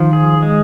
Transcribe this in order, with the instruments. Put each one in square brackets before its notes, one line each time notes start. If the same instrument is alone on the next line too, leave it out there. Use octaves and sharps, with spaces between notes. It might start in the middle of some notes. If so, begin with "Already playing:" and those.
Already playing: [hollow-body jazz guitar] D#3 [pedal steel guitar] F3
[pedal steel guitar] G#4
G#3